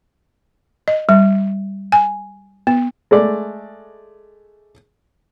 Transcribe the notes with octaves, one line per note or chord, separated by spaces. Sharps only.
D#5
G3
G#5
B3
G#3 A3 D5